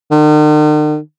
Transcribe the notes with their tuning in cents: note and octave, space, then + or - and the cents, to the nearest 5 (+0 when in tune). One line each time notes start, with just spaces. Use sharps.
D#3 -45